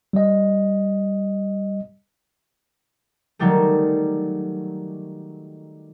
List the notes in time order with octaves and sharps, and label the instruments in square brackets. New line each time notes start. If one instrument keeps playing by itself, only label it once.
[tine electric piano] G3 D#5
[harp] D#3 F#3 G3 A3